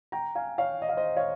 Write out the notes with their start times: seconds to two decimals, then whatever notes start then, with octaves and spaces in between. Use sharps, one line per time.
0.12 G5 A#5
0.35 F5 G#5
0.58 C#5 F5
0.82 D#5
0.89 F5
0.97 C5 D#5
1.17 C#5 F5